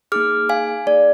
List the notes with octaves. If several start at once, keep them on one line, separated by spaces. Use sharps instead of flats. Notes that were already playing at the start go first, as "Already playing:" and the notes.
A#3 D#4 G#4 D6 F6
F5 G#5
A#3 D#4 G#4 D5